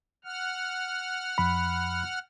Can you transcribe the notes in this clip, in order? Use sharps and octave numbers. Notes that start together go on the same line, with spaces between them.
F#5 F6
F2 B5